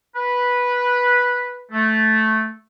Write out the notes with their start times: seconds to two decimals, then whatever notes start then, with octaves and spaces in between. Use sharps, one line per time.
0.15 B4
1.72 A3